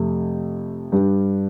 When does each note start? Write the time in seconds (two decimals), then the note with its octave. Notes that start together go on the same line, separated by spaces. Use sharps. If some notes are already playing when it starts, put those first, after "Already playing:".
Already playing: F2 C3 A3
0.92 G2 G3 D4 G4